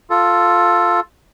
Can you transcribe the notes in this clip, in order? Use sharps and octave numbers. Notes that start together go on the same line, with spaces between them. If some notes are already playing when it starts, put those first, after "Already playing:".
F4 A4